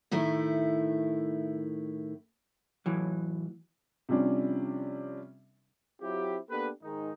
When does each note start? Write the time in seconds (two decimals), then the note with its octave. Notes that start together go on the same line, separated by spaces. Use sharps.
0.11 A2 D#3 A3 E4
2.86 A2 E3 F#3
4.09 C3 F3 G3 C#4 D4
6.01 F#3 C4 E4 F4 G4
6.49 A#3 B3 D4 G4 A4 B4
6.82 G#2 D#3 G#3 D#4